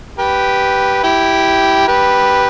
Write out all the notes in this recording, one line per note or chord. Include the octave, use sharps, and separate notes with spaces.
G4 B4
E4 G4
G4 B4